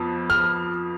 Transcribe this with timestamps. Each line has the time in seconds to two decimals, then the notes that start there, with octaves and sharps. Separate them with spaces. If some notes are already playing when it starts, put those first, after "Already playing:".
Already playing: F2 F3 B3
0.30 F6